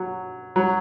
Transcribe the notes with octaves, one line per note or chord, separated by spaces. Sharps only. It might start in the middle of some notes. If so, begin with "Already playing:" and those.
Already playing: F#3
F#3